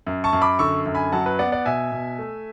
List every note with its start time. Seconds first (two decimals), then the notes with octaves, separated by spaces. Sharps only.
0.07 F#2
0.24 A5 C#6
0.33 F#2
0.42 B5 D6
0.59 D3 C#6 E6
0.86 F#2
0.95 G#5 B5
1.12 F#3 F#5 A5
1.26 B4
1.39 B3 D5 F#5
1.52 D5 F#5
1.66 B2 E5 G#5
1.92 B2
2.19 A3